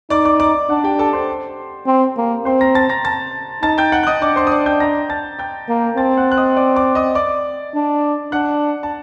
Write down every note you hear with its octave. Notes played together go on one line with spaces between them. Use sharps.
D#4 D5 D6
D5 D6
D5 D6
D4 F#5
G4 G5
A4 A5
C5 C6
C4
A#3
C4 C5 C6
A#5 A#6
A5 A6
A#5 A#6
A5 A6
D#4 A5 A6
G5 G6
F#5 F#6
F#6
D#5 D#6
D4 D5 D6
C5 C6
D#6
D5 D6
G5 G6
A#5 A#6
A5 A6
G5 G6
A#3
C4 A5 A6
F#5 F#6
F#6
D#5 D#6
D5 D6
D5 D6
D#5 D#6
D5 D6
D4
D4 F#5 F#6
A5